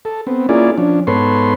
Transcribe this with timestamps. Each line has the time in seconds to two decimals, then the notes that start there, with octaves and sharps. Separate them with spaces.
0.05 A4
0.27 B3 C4
0.49 A#3 C#4 E4 F4 G#4 D5
0.78 F3 C#4 D4
1.07 G#2 B3 A4 B4 C#5 C6